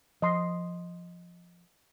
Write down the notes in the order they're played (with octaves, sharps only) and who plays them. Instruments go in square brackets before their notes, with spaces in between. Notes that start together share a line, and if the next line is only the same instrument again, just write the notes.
[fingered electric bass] F3 [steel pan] D#5 C6